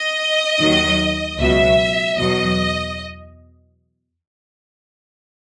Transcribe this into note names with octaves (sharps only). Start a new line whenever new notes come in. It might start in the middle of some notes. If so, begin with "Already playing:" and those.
Already playing: D#5
D#2 D#3 F#3
C#2 B2 F#3 E5
E2 B2 F#3 D#5